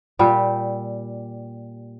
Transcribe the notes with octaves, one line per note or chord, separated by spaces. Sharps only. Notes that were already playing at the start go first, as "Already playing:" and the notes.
A#2 G3 G4